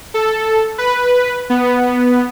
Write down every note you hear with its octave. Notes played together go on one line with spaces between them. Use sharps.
A4
B4
B3